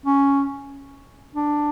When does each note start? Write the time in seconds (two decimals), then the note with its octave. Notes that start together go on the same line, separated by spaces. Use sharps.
0.06 C#4
1.34 D4